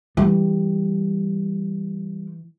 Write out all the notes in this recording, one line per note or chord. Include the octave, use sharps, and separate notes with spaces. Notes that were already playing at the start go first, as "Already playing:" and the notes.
E3 G3